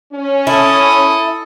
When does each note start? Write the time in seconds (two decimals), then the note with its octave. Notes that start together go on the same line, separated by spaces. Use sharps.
0.13 C#4
0.47 E4 A4 D#6